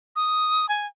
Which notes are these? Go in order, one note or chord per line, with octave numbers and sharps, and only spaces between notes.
D#6
G#5